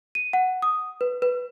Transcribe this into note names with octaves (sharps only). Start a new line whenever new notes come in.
D#7
F#5
D#6
B4
B4